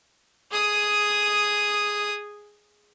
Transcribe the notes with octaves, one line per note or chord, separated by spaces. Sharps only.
G#4 D#6